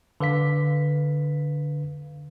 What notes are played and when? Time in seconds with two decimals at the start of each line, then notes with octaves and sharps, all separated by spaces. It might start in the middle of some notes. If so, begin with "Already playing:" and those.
0.20 D3 B4 F5 B6